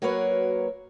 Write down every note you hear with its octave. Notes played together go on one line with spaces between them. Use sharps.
F#3 A#3 F#4 A#4 B4 C#5